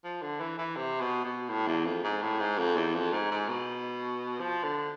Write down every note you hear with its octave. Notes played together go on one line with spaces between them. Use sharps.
F3
D3
E3
E3
C3
B2
B2
A2
E2
F2
G#2
A2
G#2
F2
E2
F2
G#2
G#2
B2
F3
D3